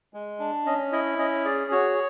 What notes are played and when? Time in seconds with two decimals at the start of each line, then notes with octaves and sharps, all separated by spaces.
0.14 G#3
0.40 D4
0.65 C#4 D#5
0.92 E4 D#5
1.19 C#4 D#5
1.45 G#4 D5
1.71 F#4 C#5